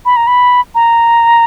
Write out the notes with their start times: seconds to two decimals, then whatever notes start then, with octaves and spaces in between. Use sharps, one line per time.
0.06 B5
0.16 A#5
0.27 B5
0.75 A#5